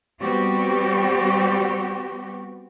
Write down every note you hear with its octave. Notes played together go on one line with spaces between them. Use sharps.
G3 B3 C4 F#4 G4